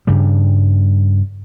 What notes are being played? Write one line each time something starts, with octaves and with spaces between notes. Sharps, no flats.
G2 C#3 G3